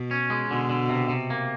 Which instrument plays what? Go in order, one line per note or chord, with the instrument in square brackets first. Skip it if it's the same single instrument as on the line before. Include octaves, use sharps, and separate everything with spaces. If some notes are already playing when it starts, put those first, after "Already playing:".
Already playing: [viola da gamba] B2
[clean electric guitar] C#4
G#3
[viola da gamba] B2 [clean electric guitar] D3
[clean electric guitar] D3
C3
C3
A#3